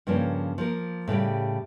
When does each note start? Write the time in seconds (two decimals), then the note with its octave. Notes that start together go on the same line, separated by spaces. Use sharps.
0.07 G2 C#3 F3 A#3 C#4
0.58 F3 A#3 A#4
1.08 A2 C#3 G3 G4